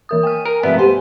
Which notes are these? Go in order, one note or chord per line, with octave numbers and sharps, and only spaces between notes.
E3 A#4 D#6
G5 G#5 F6
A#4
C3 F3 A3 B3 D5 E5
G4 C5 G#5